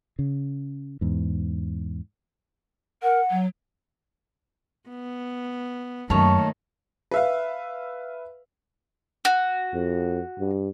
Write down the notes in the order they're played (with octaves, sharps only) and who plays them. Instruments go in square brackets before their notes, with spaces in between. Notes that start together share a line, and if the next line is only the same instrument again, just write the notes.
[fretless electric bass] C#3
E2 G#2
[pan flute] A#4 [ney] F#5
[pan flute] F#3
[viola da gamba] B3
[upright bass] F#2 [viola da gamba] D#3 A3 A#3 [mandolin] C#4 C#5 A5
[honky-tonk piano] B4 E5 F5
[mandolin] F#4
[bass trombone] F2
G2